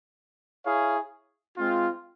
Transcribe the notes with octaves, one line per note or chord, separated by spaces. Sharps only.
E4 G#4 C#5 F5
G#3 C4 F4